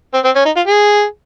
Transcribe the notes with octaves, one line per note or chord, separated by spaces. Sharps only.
C4
C4
C#4
D#4
F4
G#4